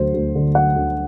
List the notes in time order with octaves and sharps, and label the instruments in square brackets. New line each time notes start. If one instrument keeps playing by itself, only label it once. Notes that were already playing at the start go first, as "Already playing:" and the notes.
Already playing: [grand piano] D2 F#3 C5
D2
D3
F#3 F#5
D2